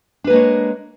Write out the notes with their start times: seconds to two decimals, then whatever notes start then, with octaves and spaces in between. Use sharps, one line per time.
0.24 D4
0.27 B4
0.30 A#3
0.33 G#3
0.36 C#5